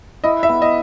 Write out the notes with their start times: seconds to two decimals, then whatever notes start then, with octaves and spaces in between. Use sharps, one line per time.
0.24 E4 D#5
0.43 E5
0.49 B3
0.62 D#5